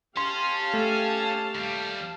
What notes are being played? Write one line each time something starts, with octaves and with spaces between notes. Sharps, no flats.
C#4 G4 F5 A5 C6
A3
D#2 G3